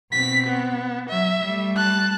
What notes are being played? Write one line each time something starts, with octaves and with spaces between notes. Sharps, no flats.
B2 C4 B6
B3
F#3 E5
G3 A3
A5 F#6